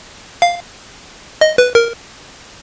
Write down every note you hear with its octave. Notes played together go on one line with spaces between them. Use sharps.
F5
D#5
B4
A#4